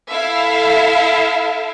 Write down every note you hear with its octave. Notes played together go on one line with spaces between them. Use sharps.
E4 A4 E5 F5